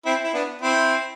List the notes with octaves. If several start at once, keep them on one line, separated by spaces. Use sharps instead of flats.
C4 E4
E4
B3 D4
C4 E4